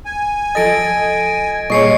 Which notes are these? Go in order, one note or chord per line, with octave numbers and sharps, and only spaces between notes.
G#5
F3 A4 D#5 A6 A#6 D7
A#2 G3 G#4 C#5 D#5 C#6 C7 C#7